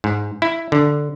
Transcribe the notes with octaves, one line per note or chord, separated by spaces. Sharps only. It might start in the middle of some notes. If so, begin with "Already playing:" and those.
G#2
E4
D3